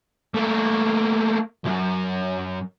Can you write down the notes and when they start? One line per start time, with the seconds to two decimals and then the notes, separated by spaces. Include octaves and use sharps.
0.34 A3 A#3
1.64 B1 F#2